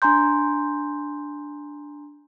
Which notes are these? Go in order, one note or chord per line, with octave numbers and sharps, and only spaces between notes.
D4 G#5 A#5 C6 G6